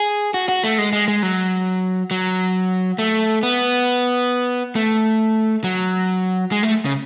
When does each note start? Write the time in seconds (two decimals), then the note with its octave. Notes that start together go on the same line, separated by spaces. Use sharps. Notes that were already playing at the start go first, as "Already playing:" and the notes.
Already playing: G#4
0.34 F#4
0.49 F#4
0.63 A3
0.78 G#3
0.93 G#3
1.08 G#3
1.23 F#3
2.11 F#3
2.98 A3
3.43 B3
4.75 A3
5.64 F#3
6.52 G#3
6.63 A3
6.85 C#3